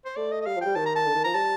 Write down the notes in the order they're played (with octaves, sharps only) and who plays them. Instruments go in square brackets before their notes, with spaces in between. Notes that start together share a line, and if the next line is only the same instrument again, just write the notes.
[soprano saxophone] C5
[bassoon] A3 [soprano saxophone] D5
[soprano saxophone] D#5
D#5
[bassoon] G3 [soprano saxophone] F5
[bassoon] F3
[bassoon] G3 [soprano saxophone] G5
[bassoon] D#3 [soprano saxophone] A5
[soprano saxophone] A#5
A5
[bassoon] D3
D#3
[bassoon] F3 [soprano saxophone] A#5
[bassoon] G3 [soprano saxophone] A5